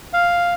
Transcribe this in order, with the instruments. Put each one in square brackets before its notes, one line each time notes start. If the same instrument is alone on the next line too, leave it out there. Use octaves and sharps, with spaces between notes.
[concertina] F5